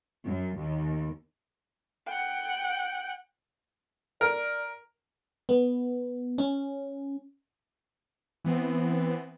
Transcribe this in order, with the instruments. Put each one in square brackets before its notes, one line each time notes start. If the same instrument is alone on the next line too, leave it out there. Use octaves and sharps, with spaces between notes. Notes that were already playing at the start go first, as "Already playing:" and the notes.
[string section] F#2
D#2
[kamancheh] F#5 G5
[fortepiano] A#4 [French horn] D5
[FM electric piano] B3
C#4
[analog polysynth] E3 B3 C4